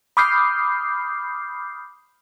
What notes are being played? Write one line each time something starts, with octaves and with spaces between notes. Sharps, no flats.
B5 D6 D#6 F6 G6 C7